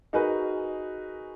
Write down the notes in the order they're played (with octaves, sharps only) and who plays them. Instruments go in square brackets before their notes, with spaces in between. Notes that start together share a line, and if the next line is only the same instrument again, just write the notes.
[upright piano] D#4 F#4 G#4 A#4 B4